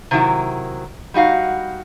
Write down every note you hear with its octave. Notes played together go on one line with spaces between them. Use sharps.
C3 D#3 F#3 E4
G3 D#4 F#4 F5